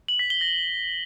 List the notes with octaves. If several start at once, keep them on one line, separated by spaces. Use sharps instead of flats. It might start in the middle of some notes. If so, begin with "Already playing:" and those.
F#7
B6
G7
A#6